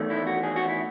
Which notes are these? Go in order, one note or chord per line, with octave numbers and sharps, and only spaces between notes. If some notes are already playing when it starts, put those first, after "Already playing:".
Already playing: E2 D#3 A3
E4
F#4
G#4
F#4
E4